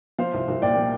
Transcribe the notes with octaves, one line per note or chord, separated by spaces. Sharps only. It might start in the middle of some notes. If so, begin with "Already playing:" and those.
F3 C5 F5
C2
C2
A#2 D5 G5
F3